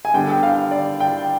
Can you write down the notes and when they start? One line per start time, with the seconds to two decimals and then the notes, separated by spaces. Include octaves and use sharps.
0.05 G#5
0.14 D3 G3 B3 G5
0.31 G5
0.43 F5
0.71 D5
1.00 G5